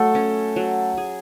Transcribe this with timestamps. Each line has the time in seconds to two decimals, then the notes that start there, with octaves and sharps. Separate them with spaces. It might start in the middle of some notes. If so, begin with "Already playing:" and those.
Already playing: F#3 A3 A4
0.15 C#4
0.56 F#3
0.98 G#4